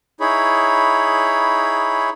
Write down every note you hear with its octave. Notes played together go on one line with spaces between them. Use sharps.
D#4 E4 G#4 C#5 B5